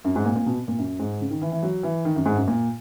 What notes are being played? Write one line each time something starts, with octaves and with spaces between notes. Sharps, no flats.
F#2
G#2
A#2
A#2
B2
A#2
F#2
G#2
C#3
D#3
E3
E3
F#3
E3
D#3
F#2
G#2
F#2
A#2